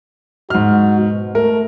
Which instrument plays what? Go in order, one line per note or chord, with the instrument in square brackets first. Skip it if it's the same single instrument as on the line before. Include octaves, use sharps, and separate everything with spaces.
[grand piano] G#2 F6 [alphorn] F#4
[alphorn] B2
[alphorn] A3 [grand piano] A#4